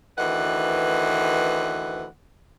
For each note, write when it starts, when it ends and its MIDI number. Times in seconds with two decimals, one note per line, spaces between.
0.17 2.06 38
0.17 2.06 51
0.17 2.06 52
0.17 2.06 71
0.17 2.06 78